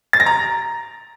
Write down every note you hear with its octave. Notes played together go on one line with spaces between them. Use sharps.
A6
A#6
A#5